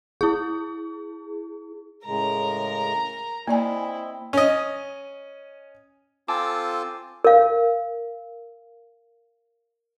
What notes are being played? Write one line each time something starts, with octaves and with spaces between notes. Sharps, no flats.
E4 G#4
A2 C#3 G#3 A#4 A#5
A#3 C4 E4 D5 D#5 G#5
C#4 D#5
C4 F4 A4 G#5 A5 D6
A#4 F5